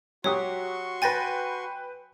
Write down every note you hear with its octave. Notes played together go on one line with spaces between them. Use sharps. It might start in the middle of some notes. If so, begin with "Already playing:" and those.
F#3 F#4 G4 C#5 C6 C#6 D#6
B4 G5 G#5 A6 A#6